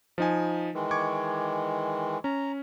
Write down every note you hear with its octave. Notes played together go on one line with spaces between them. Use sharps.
F3 D#4 G#5
D#3 E3 G#3
C#6 D6 G#6
C#4 A#5